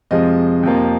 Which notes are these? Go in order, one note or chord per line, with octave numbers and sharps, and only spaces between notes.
F2 C3 F3 G#3 D#5
F2 C3 F3 A#3